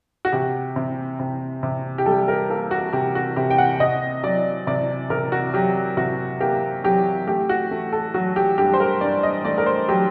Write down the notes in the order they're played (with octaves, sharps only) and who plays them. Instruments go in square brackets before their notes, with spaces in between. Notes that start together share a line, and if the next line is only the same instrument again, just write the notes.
[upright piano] F#4
C3 G4
C3
C3
C3
G4
G3 A4
A#4
A#3 A4
F#4
C3 G4
F#4
C3 G4
G5
F#5
C3 D#5
F#3 D5
C3 D5
C3 A#4
F#4
F#3 G4
C3 F#4
A#3 G4
F#3 G4
A3 G4
F#4
A3
A4
F#3 F#4
G4
G2 G4
C5
A#4
G2 D5
D#5
A3 D5
A#4
C5
F#3 G4